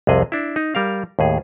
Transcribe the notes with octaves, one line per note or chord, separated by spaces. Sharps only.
C2 F2 C3 G#4 D#5
D4 E4
D#4
G3 A#4 F5
D#2 A2 G#4